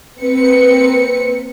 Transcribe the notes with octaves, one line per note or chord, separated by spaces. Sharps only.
A#3 C4 B4 C#7